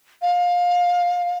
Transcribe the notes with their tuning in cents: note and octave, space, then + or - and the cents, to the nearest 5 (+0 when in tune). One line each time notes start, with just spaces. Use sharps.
F5 +20